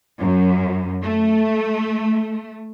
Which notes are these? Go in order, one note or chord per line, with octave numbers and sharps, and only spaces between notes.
F#2
A3